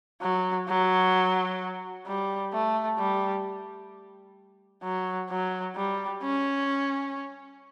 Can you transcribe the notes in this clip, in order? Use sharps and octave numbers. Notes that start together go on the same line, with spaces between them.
F#3
F#3
G3
A3
G3
F#3
F#3
G3
C#4